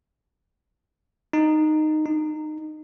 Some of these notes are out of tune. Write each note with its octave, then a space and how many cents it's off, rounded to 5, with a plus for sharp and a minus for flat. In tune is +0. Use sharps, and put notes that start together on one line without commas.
D#4 -10
D#4 -20